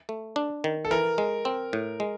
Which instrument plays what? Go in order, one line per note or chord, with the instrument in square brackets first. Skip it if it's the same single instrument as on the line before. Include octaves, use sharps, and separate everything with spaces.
[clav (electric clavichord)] A3
D4
D#3
[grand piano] A4
[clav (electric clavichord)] E3 [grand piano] A#4
[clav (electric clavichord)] G#3
C4
A2
G#3